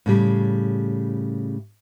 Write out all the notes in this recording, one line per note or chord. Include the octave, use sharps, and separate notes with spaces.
A2 C#3 G3